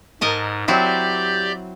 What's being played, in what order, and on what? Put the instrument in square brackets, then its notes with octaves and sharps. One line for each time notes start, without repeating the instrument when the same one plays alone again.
[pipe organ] G#2 [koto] A#4 D#5 A5
[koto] F#3 C4 E4 [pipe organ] G4 D5 G6